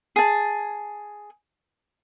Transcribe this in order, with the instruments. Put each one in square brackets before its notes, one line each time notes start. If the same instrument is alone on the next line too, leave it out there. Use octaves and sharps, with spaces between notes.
[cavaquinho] G#4 A5